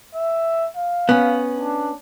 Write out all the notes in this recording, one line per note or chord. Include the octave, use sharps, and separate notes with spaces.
E5
F5
B3 C#4
D4